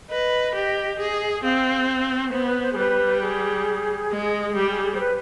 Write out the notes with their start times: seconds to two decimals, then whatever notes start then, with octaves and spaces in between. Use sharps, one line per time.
0.09 B4 D#5
0.55 G4
0.99 G#4
1.43 C4 F5
2.32 B3 C5
2.47 B4
2.62 C5
2.73 G#4
2.77 G3 B4
3.21 G#4
4.10 G#3
4.49 G#4
4.55 G3 G4
4.71 G#4
4.85 G#4
4.95 C5
5.00 B4